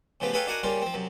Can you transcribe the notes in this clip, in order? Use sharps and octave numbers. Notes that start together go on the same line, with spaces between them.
A2 C#3 F3 B3 G4
G#4 A4 B4 C#5 F5 G5
D4 D#4 F#4 A#4 F#5 G#5
C#3 G3 A#3 C#4 F4
F3 C4
F#2 C3